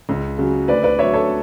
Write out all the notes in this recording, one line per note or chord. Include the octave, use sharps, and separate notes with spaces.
C#2
C#3 F#3
D2 B4 D5
B4 D5
D3 F#3 C#5 E5
A4 C#5